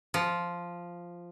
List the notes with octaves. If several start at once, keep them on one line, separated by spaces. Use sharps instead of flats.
F3